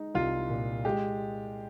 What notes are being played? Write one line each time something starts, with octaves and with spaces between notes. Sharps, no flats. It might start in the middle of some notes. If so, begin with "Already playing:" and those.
Already playing: G#3 D#4
C2 F4
A#2
G#3 G4